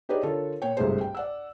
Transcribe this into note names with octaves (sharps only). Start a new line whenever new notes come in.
D#4 G4 G#4 B4 C#5 D5
D3 F4 A4 A#4 C#5
A#2 C#5 G5
G1 C2 G#2 A3 G#4 C5
G5
D5 F#5 E6